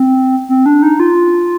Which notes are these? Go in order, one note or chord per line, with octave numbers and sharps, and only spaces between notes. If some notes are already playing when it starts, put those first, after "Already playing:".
Already playing: C4
C4
D4
D#4
F4